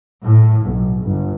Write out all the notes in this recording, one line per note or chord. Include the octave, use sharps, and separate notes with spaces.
A2
B1
G1